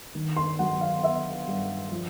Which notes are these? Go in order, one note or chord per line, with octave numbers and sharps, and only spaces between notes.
D#3
C6
F#3 F#5
F5
B3 E5
G2
F3